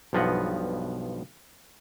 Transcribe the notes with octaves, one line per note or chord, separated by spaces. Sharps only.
B1 G2 F3 B3 D#5 F#5